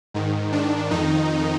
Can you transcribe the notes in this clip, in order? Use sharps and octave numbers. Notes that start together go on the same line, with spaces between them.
G#2 D#3
G#2 D#3 D4
F2 D#3 D#4